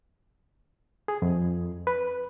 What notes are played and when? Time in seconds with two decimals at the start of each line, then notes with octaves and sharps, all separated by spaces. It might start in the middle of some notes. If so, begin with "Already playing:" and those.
1.08 G#4
1.22 F2
1.87 B4